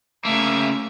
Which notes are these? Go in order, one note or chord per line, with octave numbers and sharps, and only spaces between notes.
C#3 A3 A#3 E5